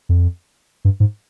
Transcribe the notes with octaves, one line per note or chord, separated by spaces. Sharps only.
F2
G2
G#2